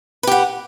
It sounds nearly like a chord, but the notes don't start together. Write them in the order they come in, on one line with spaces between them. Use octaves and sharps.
B4 G4 F#5